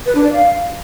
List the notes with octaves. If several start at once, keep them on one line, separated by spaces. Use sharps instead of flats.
B4
D4
D5
F5